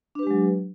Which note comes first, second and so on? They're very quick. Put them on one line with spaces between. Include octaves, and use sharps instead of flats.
D4 B4 G4 G#3 F#3